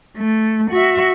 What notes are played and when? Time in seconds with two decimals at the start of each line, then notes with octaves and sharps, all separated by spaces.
0.17 A3
0.72 F#4 E5